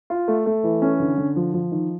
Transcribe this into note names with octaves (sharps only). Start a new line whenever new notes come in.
F4
A3
A3
E3
C#4
D3
D3
F3
F3
D#3